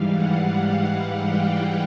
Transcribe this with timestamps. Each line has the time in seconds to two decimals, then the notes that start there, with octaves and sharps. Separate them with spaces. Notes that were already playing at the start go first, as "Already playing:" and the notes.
Already playing: G#2 E3 G3 F5
0.13 F#5
0.52 F#5
1.28 G5